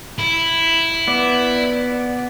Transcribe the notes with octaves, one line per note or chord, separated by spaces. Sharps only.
E4
B3 D5